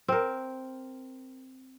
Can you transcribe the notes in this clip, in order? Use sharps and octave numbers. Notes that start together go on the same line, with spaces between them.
C4 A#4